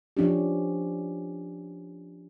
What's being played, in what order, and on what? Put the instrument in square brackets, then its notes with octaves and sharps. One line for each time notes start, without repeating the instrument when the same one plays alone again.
[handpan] F3 C#4 D4 G4